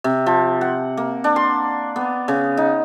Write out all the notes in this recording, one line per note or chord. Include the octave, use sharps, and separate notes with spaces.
C3
F3
F#5
A#3
D4
C6
B3
C#3
D#4